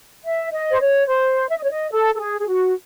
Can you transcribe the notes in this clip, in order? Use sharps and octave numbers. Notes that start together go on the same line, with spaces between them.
E5
D#5
C5
C#5
C5
E5
D#5
C#5
D#5
A4
A4
G#4
G#4
F#4